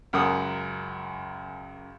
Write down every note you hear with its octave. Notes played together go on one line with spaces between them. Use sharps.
C#2 F#2 A#4 F#5 D#6